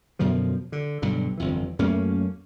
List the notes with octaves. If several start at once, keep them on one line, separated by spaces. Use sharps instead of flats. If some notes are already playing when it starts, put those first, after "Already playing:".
F#2 B2 D3 F3
D3
B1 G2 D3
G1 F2 E3
F#2 A3 A#3 C#4